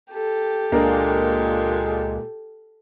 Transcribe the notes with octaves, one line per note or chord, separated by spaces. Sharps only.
G4 A4
C#2 A#2 G#3 A#3 D4 A#4